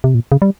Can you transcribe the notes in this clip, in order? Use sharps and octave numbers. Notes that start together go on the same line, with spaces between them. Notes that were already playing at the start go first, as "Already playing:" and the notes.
C3
A#2
C#3
G3